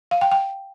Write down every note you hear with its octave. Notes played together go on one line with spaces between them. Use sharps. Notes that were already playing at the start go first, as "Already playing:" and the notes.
F5
G5
G5